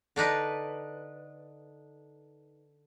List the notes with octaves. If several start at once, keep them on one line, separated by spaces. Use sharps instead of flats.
D3 D4 D#4 B4